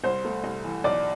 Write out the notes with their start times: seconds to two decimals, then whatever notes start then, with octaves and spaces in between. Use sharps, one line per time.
0.04 C2 C5
0.24 A3
0.44 C2
0.64 E3
0.84 B1 D5